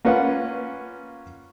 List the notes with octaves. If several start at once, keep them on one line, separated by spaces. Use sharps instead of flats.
A#3 C#4 F4 B4 F#5